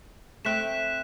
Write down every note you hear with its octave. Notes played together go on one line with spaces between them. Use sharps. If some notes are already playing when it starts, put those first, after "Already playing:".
A3 C4 G5 F#6 B6 E7